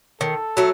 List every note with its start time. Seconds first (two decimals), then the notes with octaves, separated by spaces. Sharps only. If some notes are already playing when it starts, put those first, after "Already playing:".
0.21 D#3 A4
0.57 F#3 A3